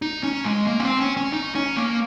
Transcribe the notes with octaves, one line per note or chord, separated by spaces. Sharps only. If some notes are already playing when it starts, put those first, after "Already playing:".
D#4
C#4
G#3
A#3
C#4
C4
C#4
C#4
D#4
C#4
A#3